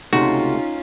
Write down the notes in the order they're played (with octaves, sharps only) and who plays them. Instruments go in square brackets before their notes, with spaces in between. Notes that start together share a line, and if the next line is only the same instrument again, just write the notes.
[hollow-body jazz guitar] C#2 C3 A3 [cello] C#4 F4 [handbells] D#4 [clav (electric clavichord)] F#4